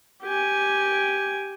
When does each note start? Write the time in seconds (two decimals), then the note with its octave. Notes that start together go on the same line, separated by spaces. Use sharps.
0.23 G4 G#5